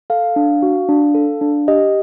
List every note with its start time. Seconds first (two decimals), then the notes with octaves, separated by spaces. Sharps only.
0.10 A4 F5
0.36 D4
0.63 F#4
0.89 D4
1.15 A4
1.41 D4
1.68 G4 D#5